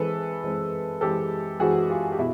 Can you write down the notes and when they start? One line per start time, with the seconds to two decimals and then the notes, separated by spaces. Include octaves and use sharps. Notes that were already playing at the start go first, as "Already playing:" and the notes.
Already playing: E3 G#3 C4 A4 B4
0.44 E3 G#3 C4
1.01 E3 G#3 C4 G4 A4
1.60 E3 G#3 C4 F#4 G#4
1.89 F4 G4
2.12 G4
2.18 B2 E4